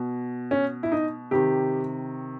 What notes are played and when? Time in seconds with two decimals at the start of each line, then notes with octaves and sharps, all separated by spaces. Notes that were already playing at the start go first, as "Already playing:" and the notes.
Already playing: B2
0.51 C#4
0.83 E4
0.92 D#4
1.31 C3 D#3 G4